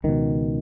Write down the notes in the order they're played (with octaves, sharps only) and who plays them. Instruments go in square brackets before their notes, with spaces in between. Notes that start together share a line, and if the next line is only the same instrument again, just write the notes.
[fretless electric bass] C#2 B2 D#3